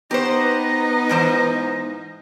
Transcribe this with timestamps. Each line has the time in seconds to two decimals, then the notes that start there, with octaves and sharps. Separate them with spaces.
0.11 B3 D#4 G4 B4 C5 A#6
1.09 G#2 E3 C5